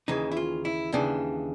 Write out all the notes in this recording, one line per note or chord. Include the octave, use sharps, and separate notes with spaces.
D#2 C#3 E3 D#4
E4
F4
E4
D#2 C#3 E3 D4